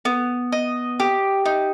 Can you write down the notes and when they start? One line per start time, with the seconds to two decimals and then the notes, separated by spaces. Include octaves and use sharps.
0.05 B3
0.52 D#5
1.00 G4
1.46 D#4